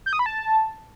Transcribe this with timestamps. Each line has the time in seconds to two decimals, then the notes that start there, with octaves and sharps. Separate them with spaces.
0.06 G6
0.13 D#6
0.19 B5
0.26 A5